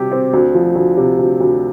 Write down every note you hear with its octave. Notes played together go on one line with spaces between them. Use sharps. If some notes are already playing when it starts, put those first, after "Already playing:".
Already playing: C3 G3 G4
C4
D2
F3
D2
C3
D2
D2